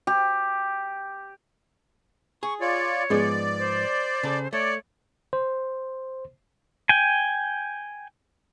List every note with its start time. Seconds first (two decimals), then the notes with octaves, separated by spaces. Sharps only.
0.07 G4
2.43 G#4 C#6
2.61 F4 C#5 D5
3.10 G#2 F3 G#3 B3 D5
3.58 C5
4.23 C#3 A4
4.53 A3 C#5 D5
5.33 C5
6.89 G5 G#5